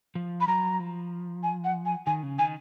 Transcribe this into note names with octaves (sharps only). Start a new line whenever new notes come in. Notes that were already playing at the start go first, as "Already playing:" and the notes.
F3
B5
F#3 A#5
F3
G#5
F#5
G#5
D#3 G#5
C#3
D#3 G#5